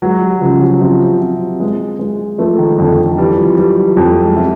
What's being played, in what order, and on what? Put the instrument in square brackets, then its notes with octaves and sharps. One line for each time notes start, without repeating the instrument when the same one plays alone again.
[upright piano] F#3 [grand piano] G#3
[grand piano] G3
[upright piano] C#3 [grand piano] F3
[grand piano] F#3
[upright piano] C3 [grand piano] F3
[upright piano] C3
G#3
G#3
[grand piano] F3 [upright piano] A3
[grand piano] D#3
[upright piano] F2 [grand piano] D3
[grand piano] D#3
[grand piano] E3 [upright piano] G3
[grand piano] F3
[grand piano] F#3 [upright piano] G3
[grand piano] F#3
F3
[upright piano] F2 [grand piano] F#3
[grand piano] G#3
[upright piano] C3